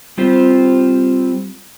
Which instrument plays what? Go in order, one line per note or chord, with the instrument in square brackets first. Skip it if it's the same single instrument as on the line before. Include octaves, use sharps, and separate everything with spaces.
[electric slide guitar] G3 C4 F4 G4 C5